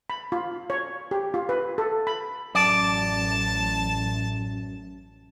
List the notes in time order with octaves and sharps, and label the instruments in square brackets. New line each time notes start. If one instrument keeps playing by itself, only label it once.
[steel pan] B5
F4
C#5
G4
F4
B4
A4
B5
[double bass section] A1 [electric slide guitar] F#2 [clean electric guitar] D5 [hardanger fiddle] A5